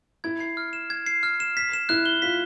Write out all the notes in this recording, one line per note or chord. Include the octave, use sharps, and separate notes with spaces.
E4 G#6
C7
F6
E7
G#6
C7
F6
E7
B6
E7
E4 F#6
G7
F4 B6